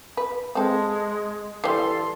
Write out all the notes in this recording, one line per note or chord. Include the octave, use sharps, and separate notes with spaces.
B4
G#3 C4 A4
E3 G3 A4 C6